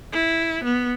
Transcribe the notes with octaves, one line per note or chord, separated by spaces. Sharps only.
E4
B3